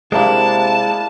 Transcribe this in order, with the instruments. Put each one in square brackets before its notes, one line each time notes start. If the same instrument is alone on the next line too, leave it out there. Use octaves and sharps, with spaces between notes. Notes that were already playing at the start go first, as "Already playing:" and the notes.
[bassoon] C3 [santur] G3 A#3 D4 [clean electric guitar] G#3 E4 [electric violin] A5